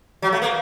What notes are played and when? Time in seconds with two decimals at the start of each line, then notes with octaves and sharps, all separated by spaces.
0.22 F#3
0.32 A3
0.42 A#3